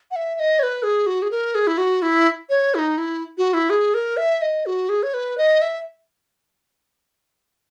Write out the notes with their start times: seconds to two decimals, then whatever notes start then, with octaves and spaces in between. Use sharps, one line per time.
0.11 F#5
0.16 E5
0.35 E5
0.40 D#5
0.59 C#5
0.63 B4
0.83 G#4
1.06 F#4
1.22 G#4
1.31 A#4
1.55 G#4
1.67 E4
1.78 F#4
2.02 E4
2.50 C#5
2.75 E4
2.79 D#4
2.98 E4
3.38 F#4
3.54 E4
3.70 G#4
3.94 A#4
4.17 E5
4.42 D#5
4.66 F#4
4.89 G#4
5.03 C#5
5.14 B4
5.38 D#5
5.62 E5